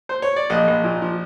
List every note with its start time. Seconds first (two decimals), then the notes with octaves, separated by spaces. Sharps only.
0.09 C5
0.22 C#5
0.36 D5
0.50 A#1 D#5
0.68 A#1
0.84 A#2
1.02 F3